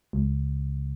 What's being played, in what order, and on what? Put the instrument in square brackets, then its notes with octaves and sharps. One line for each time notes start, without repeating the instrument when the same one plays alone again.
[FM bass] C#2